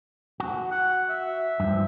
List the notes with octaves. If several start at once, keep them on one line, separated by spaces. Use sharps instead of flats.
F#4
F#5
E5
G2 F3